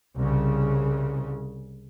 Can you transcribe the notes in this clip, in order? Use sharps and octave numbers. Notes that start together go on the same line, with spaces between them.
C2 C#3